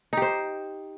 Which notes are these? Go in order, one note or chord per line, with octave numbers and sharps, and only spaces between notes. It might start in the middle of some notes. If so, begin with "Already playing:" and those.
D#4 G4 C5